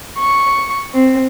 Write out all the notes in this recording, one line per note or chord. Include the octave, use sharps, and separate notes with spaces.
C#6
C4